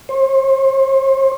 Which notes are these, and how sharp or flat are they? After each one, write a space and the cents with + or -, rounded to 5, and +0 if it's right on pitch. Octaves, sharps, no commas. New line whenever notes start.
C5 +40